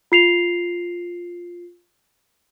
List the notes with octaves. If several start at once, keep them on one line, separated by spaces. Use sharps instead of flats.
F4 C7 F7